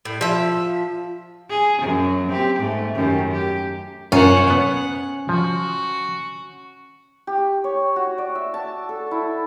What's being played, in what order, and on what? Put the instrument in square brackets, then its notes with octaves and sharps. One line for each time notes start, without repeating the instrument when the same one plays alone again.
[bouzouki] A2
F3 E5
[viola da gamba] G#4
F#2 F#3
C4 G4
G#2 A3
F#2 D#3 G4
G4
[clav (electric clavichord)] F#2 F4 [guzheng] C#4 [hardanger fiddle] C5 F#5
[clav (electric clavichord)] B3 C#5 [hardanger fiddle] F#5
[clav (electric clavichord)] F3 [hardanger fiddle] F#4
[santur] G4
C#5
F#4
D5
E5
A5
A4
E4